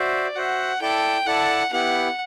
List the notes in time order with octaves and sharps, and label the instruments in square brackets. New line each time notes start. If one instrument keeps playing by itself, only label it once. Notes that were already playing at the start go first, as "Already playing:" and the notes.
Already playing: [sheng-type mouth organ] F#4 C5 E5 [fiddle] D5
[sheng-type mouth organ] F#4 C5 E5 [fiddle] F#5
[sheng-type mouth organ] E4 A4 D5 A5 [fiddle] G5
[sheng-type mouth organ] E4 A4 D5 A5 [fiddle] F#5
[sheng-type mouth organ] B3 E4 G4 [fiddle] F#5